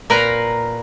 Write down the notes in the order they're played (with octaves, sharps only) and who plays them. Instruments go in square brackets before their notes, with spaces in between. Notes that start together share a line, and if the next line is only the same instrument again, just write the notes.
[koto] A#2 A#4 B4 F5 A#5